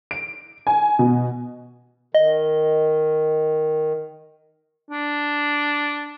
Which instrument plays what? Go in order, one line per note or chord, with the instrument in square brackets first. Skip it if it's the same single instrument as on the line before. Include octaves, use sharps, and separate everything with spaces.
[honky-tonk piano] D7
G#5
B2
[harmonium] D#3 [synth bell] D#5
[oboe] D4